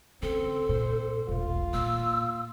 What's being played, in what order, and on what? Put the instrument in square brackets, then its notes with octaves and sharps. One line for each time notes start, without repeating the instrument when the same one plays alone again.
[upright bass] C#3 [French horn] C4 [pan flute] A4
[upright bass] A#2 [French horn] C5
[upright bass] E1 A#1 [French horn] F4
[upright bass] A#2 [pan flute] E6